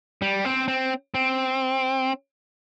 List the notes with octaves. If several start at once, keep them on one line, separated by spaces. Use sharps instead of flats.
G3
C4
C4
C4